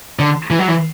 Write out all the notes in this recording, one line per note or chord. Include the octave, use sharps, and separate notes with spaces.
D3
E3
F#3
E3